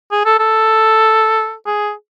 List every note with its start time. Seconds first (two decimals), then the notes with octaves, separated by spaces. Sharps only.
0.12 G#4
0.25 A4
0.39 A4
1.66 G#4